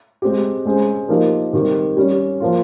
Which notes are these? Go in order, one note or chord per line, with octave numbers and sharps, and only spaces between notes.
G#3 C4 G4
G#3 C#4 G#4 C5
F3 A#3 D#4 G4 A#4
D#3 G3 C4 G4 A#4
G3 C#4 G4 C#5
F3 A#3 F4